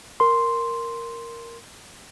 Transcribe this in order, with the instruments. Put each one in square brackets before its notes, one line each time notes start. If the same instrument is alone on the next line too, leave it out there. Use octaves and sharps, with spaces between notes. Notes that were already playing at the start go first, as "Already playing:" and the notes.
[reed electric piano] A#4 C6